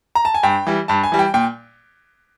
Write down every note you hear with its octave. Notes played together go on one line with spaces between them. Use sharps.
A#5
A5
G#5
G2 G5
E3 G3
G2 A5
G#5
E3 G3
G5
A#2 G5